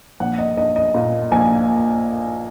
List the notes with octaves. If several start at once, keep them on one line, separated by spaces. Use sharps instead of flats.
A#1 F#5
D#5
A#1 D#5
D#5
A#2
A#1 G#5